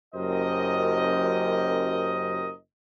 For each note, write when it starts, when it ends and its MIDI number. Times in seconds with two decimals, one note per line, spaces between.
0.15 2.52 30
0.15 2.52 42
0.15 2.52 67
0.15 2.52 70
0.15 2.52 72
0.15 2.52 75